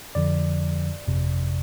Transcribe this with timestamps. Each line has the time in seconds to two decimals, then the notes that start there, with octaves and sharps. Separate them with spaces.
0.15 F2 D3 F3 D5
1.07 G1 F2 C3